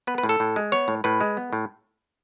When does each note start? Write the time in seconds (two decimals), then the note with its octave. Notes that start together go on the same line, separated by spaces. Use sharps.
0.07 B3 B4
0.18 B4
0.23 A2
0.29 A4
0.40 A2
0.56 G#3
0.72 B3 C#5
0.88 A2
1.04 A2 B4
1.20 G#3
1.37 B3
1.53 A2